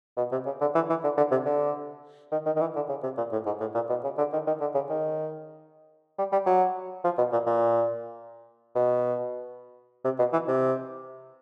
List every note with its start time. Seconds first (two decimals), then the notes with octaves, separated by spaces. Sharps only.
0.17 B2
0.32 C3
0.46 C#3
0.61 D3
0.75 E3
0.89 E3
1.04 D3
1.17 D3
1.31 C3
1.45 D3
2.32 D#3
2.46 D#3
2.56 D#3
2.60 E3
2.75 D3
2.89 C#3
3.03 C3
3.18 A#2
3.32 A2
3.46 G#2
3.60 A2
3.74 A#2
3.89 B2
4.04 C#3
4.18 D3
4.33 D#3
4.47 D#3
4.61 D3
4.74 C#3
4.90 D#3
6.18 G3
6.32 G3
6.46 F#3
7.04 F3
7.18 B2
7.32 A#2
7.46 A#2
8.75 B2
10.04 C3
10.19 B2
10.32 E3
10.47 C3